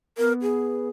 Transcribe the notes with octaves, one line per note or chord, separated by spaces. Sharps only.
B3 A#4
G#4